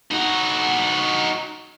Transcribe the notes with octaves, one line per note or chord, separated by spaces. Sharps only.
D#4 F#4